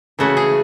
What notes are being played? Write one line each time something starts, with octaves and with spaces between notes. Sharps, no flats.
C#3 E3 A3 E4 F#4
G#4